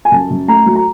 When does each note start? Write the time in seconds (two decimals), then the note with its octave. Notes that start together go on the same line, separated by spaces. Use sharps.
0.05 G#5
0.12 F#2 A5
0.30 F#2
0.47 A3 A#5
0.66 F#3
0.76 A#5